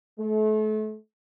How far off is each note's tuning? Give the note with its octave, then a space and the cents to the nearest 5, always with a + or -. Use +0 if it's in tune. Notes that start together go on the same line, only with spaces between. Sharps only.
A3 -35